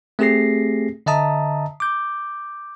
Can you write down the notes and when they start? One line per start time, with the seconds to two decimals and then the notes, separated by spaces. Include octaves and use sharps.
0.19 A3 C4 G4 G#4 A#6 C7
1.06 D3 D#5 E5 A5 A#5 D#6
1.80 D6 G6